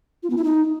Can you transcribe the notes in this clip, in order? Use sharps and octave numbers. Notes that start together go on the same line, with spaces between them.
F4
B3
E4
D#4